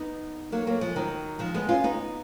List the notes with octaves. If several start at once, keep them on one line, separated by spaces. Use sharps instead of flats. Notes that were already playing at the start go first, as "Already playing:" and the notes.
Already playing: B3 D#4
F#3 A#3
F#3 A#3
F3 G#3
D#3 F#3
F3 G#3
G#3 B3
C#4 F4
B3 D#4